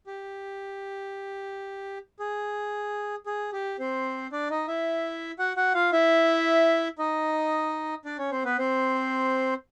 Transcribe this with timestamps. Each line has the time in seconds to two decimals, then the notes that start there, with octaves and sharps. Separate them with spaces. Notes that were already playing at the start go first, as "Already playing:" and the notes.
0.07 G4
2.20 G#4
3.26 G#4
3.53 G4
3.79 C4 C5
4.32 D4 D5
4.50 D#4 D#5
4.68 E4 E5
5.39 F#4 F#5
5.56 F#4 F#5
5.74 F4 F5
5.92 E4 E5
6.99 D#4 D#5
8.05 D4 D5
8.18 C#4 C#5
8.31 C4 C5
8.45 B3 B4
8.58 C4 C5